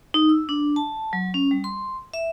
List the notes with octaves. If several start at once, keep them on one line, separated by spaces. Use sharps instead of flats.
D#4
E6
D4
A5
F#3
C#4
G3
C6
E5